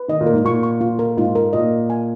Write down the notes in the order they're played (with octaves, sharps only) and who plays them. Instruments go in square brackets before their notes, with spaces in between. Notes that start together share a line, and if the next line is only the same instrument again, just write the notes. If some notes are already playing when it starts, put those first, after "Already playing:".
Already playing: [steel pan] B4
[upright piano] D#3 [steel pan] D#5
[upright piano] A#2
[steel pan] A#4
[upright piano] G#2
[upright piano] A#2 [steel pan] C#6
[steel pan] C#6
F4
A#4
[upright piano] G#2 [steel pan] F4
[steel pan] A#4
[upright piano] A#2 [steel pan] D#5
[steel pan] A#4
G#5